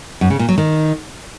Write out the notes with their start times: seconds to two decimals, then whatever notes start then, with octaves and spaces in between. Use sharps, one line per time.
0.21 F#2
0.30 C#3
0.39 A#2
0.49 F#3
0.58 D#3